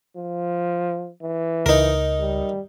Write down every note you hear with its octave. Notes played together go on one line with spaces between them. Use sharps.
F3
E3
C#2 D#4 A#4
G3